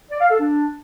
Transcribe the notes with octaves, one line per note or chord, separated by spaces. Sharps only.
D5
F5
A4
D4